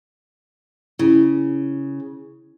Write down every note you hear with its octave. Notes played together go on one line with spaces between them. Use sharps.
C#3 E4